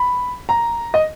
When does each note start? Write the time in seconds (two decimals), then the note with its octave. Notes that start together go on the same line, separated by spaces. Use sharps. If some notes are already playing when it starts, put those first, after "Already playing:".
Already playing: B5
0.49 A#5
0.94 D#5